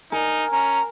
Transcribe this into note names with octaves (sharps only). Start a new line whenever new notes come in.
D#4 A#4 G#5
C#4 A#5